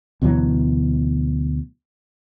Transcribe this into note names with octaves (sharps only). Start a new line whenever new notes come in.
D2 B2 E3 F#3